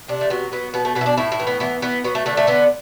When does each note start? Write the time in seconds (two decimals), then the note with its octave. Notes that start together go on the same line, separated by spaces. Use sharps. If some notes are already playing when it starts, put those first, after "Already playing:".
0.08 C3 D4
0.21 A3
0.30 F#3 B3
0.52 F#3 B3
0.74 B2 B3
0.85 A3
0.95 B2 B3
1.01 E4
1.06 D4
1.17 A2 E4
1.32 E4
1.40 E3
1.47 B3
1.60 E3 B3
1.82 E3 B3
2.04 F#3 B3
2.15 A3
2.26 D3 A3
2.37 A3
2.47 D3 B3